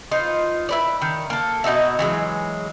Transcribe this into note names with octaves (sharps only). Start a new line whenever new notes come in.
D#4 F4 B4 C5
E4 B4 D5
D#3
A#3 A4
B2 D#4 F#4 E5
E3 F#3 G#3